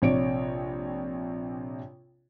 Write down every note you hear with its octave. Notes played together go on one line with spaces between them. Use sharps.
A#1 C3 C#5 D5 D7